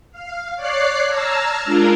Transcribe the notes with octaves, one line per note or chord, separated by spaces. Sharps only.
F5
C#5 D5 D6 F#6 C7
A5 A#5 E6 F6 G#6
G#3 D4 F4 A#4